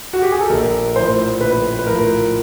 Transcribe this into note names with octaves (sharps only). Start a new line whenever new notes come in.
F#4
G4
G#4
A4
A#1 A#4
A2 F3 C5
A#1 B4
B4
A2 F3 A#4